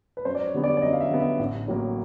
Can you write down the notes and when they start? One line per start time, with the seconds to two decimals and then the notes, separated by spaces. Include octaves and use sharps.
0.17 B4
0.25 F#2 C5
0.35 D5
0.44 C#5
0.54 D3 G3 B3
0.64 D5
0.77 D5
0.82 F#2 D#5
0.93 F5
1.01 E5
1.11 D3 G3 B3
1.20 E5
1.39 A1
1.68 A2 F#3 A#3